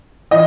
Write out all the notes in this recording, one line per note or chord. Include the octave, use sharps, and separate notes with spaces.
E3 D#5